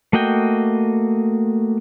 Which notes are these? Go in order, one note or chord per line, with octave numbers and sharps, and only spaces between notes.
A3 A#3 F#4 D#5 G5